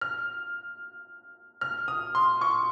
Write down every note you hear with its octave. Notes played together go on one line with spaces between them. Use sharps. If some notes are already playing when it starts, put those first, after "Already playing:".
F6
F6
D#6
C6
C#6